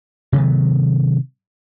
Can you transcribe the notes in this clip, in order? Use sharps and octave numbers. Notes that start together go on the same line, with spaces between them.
C3 D#3 F#3 B3